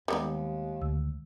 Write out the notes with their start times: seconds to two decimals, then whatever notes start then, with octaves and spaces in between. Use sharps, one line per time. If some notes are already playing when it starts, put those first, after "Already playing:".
0.08 D#2 D#3 G3 G#3 B3 D#4 D#6
0.82 D2 E6